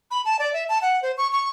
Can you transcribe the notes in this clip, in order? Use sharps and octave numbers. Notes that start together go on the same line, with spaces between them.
B5
A5
D5
E5
A5
F#5
C5
C#6
C#6